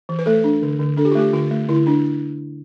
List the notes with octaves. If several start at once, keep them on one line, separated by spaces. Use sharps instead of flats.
E3
B4
A3 A4
D4
D3
D3
D4 A4
G4
F4
A3 G4
D3 F4
A3
D3 E4
D4